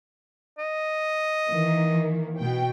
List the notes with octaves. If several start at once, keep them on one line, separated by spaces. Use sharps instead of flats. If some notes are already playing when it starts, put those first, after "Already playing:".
D#5
D#3 E3 A#3
B2 G5